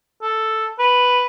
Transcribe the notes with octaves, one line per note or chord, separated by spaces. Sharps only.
A4
B4